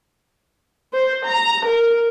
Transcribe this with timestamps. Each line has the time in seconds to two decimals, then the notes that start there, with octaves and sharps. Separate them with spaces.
0.93 C5
1.25 A#5
1.65 A#4